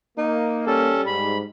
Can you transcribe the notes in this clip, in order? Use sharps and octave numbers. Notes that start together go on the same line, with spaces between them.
A#3 D#4
G3 C#4 A4
G#2 B5